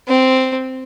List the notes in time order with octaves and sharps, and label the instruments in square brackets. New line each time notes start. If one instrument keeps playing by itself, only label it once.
[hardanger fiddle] C4